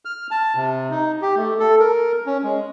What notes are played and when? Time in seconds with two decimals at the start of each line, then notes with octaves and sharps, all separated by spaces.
0.05 F6
0.31 A5
0.56 C3
0.91 D#4
1.22 G4
1.36 A3
1.60 A4
1.80 A#4
2.26 C#4
2.43 G#3